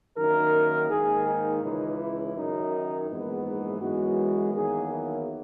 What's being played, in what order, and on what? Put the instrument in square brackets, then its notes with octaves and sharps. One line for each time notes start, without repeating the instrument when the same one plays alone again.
[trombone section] F#2 D#3 A#3 A#4
G#2 D#3 A#3 G#4
D#4
C#2 C#3 E3 D#4
E4
F#2 D#3 F#3 D#4
A#1 G#2 E3 G#3 B3
D#4
F#2 E3 G#3 B3 F#4
E2 D#3 F#3 A#3 G#4
E4